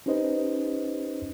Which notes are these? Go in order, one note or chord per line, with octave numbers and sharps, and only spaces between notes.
C#4 D#4 G4 B4 C5 D#5